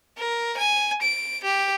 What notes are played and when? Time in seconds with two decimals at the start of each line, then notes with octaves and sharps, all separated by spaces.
0.17 A#4
0.57 G#5
1.02 D7
1.44 G4